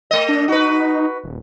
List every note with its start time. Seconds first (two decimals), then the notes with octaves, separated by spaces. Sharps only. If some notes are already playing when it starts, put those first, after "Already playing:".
0.11 A3 D#5
0.29 D4
0.48 D#4 F#4 B4
1.23 D#1